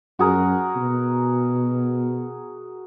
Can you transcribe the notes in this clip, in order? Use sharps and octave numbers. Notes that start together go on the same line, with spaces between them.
F#2 F#4 G#4 A#4
B2